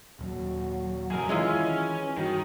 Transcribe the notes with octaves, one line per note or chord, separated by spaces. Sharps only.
D#1 D#2 F#3
F#1 F2 C3 G#4 A#4
D#3 E3 G#3 C#4 E4 F4
G2 D#3 F#4